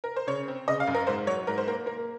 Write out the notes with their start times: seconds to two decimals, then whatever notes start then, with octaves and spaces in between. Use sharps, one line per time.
0.04 A#4
0.16 C5
0.27 C#3 C#5
0.48 C4
0.68 C#3 D#5
0.80 F5
0.87 F#2
0.95 A#4
1.07 G#2 C5
1.27 F#3 C#5
1.47 G#2 A#4
1.58 C5
1.67 A#3 A#4
1.86 A#3 A#4